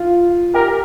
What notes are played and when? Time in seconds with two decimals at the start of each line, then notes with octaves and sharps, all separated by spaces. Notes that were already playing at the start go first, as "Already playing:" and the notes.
Already playing: F4
0.54 G4 A#4